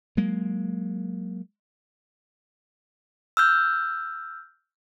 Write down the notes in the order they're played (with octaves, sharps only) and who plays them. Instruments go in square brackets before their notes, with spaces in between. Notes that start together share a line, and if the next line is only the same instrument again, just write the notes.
[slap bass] F#3 G#3 A#3
[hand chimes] E6 F6 G6